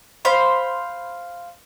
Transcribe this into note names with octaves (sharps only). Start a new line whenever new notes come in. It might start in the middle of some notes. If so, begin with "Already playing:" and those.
C5 F5 B5